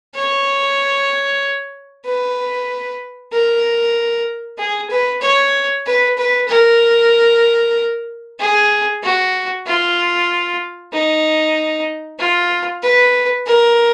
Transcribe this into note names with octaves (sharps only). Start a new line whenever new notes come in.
C#5
B4
A#4
G#4
B4
C#5
B4
B4
A#4
G#4
F#4
F4
D#4
F4
B4
A#4